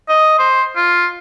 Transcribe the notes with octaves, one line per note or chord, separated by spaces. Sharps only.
D#5
C5
F4